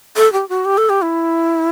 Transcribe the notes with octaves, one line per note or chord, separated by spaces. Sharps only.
A4
G4
F#4
G4
A4
G4
E4